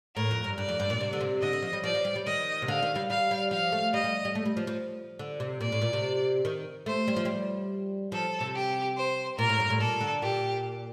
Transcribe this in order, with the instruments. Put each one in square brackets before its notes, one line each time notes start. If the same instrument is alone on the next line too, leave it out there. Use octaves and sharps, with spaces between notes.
[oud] A2 [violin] A#4
[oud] F2
G2
[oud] G2 [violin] D5
[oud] F2
G2
A#2
C3
D3
C3
[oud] D3 [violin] D#5
[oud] D3
F3
G3
[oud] F3 [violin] D5
[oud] F3
G3
G3
[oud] D#3 [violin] D#5
[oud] C3
[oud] D3 [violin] F5
[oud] D#3
G3
[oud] G3 [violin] F5
[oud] G3
[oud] F3 [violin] F5
[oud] A3
[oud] G3 [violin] D#5
[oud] G3
G3
A3
G3
F3
F3
D3
C3
[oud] A#2 [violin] D5
[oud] A2
A#2
C3
D#3
[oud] A3 [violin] C5
[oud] G3
F3
G3
[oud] F3 [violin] A4
[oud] C3
[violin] G4
C5
[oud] A#2 [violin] A#4
[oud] A2
G2
A2
[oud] A#2 [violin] A4
[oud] D3
[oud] A#2 [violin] G4